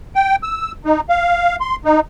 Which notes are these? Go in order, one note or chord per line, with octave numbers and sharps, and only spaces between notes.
G5
E6
D#4
F5
C6
D#4